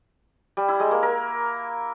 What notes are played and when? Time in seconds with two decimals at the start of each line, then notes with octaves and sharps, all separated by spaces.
0.57 G3
0.68 E4
0.80 G#3
0.91 A#3
1.03 A#4